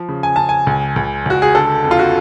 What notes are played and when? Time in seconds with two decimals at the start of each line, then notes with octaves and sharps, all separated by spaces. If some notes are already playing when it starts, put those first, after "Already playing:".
Already playing: F3
0.09 C#3
0.23 G#5
0.36 C#3 A5
0.49 G#5
0.67 C#2
0.96 C#2
1.26 C#2 F#4
1.42 G#4
1.55 D3 A4
1.84 F2
1.91 F4
1.99 F#4